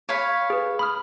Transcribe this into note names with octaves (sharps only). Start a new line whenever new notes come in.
C#5 F5 B5
G#4 B4
B5 D#6 F6